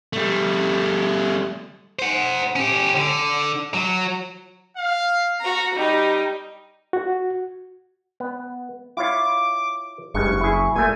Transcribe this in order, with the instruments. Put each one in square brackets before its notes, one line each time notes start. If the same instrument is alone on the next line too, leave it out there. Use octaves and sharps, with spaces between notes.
[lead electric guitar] G3 A3
[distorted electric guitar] C5 F#5
C#4 G4
D3
F#3
[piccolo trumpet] F5
[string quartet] F#4 A#5
[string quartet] G3 D#4 [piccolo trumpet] G4
[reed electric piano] F#4
[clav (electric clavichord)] B3
[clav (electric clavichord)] E4 F4 C#5 [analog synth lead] D6
[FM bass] F#1 [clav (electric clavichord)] G2 G#3 [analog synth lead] C#6
[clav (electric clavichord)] E4 G#4
[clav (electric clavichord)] A#2 A3 [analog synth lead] G#5